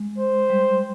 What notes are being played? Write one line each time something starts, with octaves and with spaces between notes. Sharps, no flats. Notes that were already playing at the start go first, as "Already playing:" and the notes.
Already playing: G#3
C5
G3